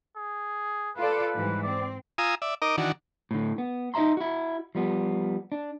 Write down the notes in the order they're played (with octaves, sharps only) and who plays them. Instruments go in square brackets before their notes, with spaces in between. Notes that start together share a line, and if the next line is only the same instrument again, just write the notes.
[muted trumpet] G#4
[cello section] F4 A4 D5 [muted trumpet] B4
[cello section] G#2 E3 G3
[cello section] C4 [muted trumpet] D5
[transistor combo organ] F4 G#5 A#5 D#6 E6
D5 E5
D#4 A#4 D#5 D6
D#3 E3 D4 F#4
[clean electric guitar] A2 D3
B3
D#4 D#5 E5 A#5 C6
E4 F#4
F3 G3 B3
D4